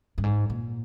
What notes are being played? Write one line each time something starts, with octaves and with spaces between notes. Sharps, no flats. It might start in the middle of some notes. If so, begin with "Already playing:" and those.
G2
G#2
A#2